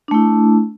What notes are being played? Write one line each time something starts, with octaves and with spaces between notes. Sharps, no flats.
A3 D4 E4